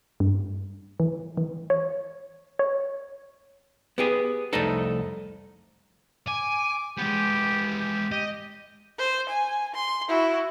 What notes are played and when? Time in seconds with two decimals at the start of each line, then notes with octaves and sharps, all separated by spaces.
0.20 G2
1.00 E3
1.37 E3
1.70 C#5
2.59 C#5
3.98 B3 G4 G#4
4.53 C2 F2 A3 D#4 A4
6.28 G#5 D6
6.98 G#3 B3 G4
7.80 G4
8.12 G4 D#5
8.99 C5
9.29 G#5
9.74 C6
10.08 E4 F#4